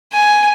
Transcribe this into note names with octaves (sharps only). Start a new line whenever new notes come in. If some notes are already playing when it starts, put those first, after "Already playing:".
G#5